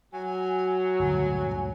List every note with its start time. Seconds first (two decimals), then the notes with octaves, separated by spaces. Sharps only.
0.13 F#3 G#5
0.99 G1 D2 A#2 G#5